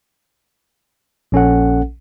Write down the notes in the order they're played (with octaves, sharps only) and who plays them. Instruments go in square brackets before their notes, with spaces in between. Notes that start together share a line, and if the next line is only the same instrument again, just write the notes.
[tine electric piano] A#1 C#4 A4 F#5